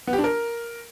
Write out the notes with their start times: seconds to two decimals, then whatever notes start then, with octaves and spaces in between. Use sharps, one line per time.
0.07 B3
0.13 G4
0.18 D4
0.24 A#4